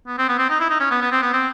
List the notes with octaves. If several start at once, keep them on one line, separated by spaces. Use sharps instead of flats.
B3
C4
B3
C4
D#4
E4
D#4
C#4
B3
B3
C4
B3
C4